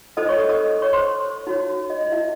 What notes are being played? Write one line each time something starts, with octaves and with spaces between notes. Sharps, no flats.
D#4 A4 C5 D#5 D#6
C#5 C#6
D#5 D#6
D#5 D#6
C#5 C#6
C5 C6
D#4 F#4 C#5
D#5
D#5
E4 E5